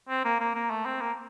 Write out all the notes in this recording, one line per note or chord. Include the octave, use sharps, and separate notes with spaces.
C4
A#3
A#3
A#3
A3
C4
A#3